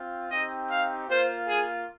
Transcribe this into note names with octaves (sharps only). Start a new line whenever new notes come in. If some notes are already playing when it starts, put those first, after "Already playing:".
Already playing: C4 F4
C4 D#4 G4 D#5
F5
A#3 F4 C5
G#4